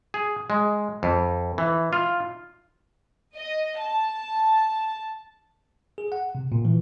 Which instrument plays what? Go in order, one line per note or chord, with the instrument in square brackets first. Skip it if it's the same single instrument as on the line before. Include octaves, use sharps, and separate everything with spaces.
[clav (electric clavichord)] G#4
G#3
F2
E3
F4
[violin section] D#5
A5
[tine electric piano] G#4
F#5
C3
A#2
E3